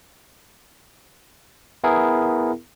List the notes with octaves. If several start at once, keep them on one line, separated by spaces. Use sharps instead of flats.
B3 E4 G#4 A#4